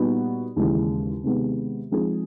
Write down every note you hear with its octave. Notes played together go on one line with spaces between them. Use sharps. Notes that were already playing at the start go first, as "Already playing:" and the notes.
Already playing: A#2 G3 B3 D#4 F#4
D#2 C#3 E3 G#3
C3 D#3 G#3 B3
F3 G#3 C4 D#4 G#4